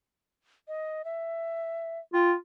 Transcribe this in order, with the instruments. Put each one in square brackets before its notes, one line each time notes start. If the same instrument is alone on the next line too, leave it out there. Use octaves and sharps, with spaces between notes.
[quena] D#5
E5
[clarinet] F4 [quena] G5